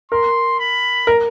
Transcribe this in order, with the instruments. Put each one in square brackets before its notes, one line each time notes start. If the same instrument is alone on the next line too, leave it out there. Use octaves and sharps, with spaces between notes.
[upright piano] A#4 [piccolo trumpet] C6
[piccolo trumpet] B5
[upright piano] A#4